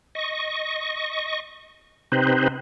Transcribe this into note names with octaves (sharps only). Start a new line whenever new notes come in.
D#5 C#6
C3 C4 D#4 B4 C5